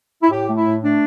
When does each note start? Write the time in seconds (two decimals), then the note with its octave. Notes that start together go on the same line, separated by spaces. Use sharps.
0.23 E4
0.31 A2 G4
0.48 A3
0.56 E4
0.65 A2
0.82 A3 D4